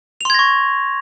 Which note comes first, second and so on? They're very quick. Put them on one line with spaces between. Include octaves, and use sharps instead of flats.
F7 C6 G#6 A#6 C#6